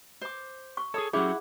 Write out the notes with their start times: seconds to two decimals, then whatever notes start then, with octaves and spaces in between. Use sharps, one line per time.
0.21 C5 D6
0.77 C#6
0.94 G#4 A4 C#5 D#6
1.13 F#3 C#4 E4 G4 G#4 F#5